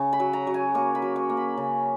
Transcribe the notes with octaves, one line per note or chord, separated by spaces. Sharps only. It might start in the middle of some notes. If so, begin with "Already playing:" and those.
Already playing: C#3 C#6
B5
F#3
A#5
F#3
G#5
A#3 C#6
B5
F#3
C#6
A#3
B5
C#3